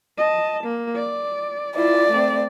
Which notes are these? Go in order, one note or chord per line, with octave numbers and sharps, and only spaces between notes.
D#5 A5
A#3
D5
E4 F4 D5
A3 C4